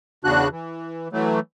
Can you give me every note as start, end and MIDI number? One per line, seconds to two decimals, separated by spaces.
0.24 0.48 40
0.24 0.48 49
0.24 0.48 62
0.24 0.48 66
0.24 0.48 90
0.52 1.08 52
1.13 1.40 52
1.13 1.40 54
1.13 1.40 57